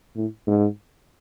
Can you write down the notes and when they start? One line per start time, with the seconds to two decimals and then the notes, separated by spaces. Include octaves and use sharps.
0.16 A2
0.47 G#2